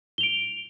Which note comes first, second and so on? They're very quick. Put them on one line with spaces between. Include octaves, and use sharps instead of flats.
G7 F7 D7